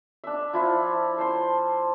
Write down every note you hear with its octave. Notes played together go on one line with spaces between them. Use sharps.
D4 E5
F3 E4 F4
C5 A5 C6